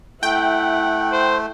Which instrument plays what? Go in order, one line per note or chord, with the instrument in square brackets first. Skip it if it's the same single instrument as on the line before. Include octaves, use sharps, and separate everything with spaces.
[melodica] A3 [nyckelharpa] E4 F#5 [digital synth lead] G5
[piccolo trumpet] C5